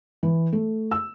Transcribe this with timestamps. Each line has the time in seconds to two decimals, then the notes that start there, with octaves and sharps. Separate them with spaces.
0.23 E3
0.52 A3
0.91 E6